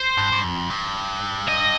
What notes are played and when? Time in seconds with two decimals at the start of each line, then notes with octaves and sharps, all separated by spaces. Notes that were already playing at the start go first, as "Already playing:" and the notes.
Already playing: C5
0.18 G2
0.32 G2
0.44 F2
0.70 G2
1.48 D#5